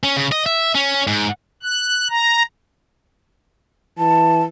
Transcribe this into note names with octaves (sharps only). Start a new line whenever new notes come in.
C#4
C#3
D#5
E5
C#4
G#2
F#6
A#5
E3 A5